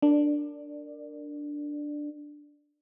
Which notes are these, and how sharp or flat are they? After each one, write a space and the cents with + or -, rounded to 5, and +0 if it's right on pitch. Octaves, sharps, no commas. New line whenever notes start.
D4 +0 A#4 -15 D5 +20